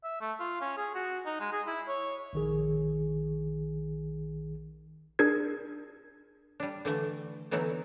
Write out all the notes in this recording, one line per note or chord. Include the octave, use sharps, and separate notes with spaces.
E5
A3
F4
C#4
G#4
F#4
D#4
G#3
G#4
E4
C#5
A#1 D#3 G#4
D4 G#4 A#4 G#6
G3 D4
D3 E3 A3
D3 E3 F#3 B3 D#4 E4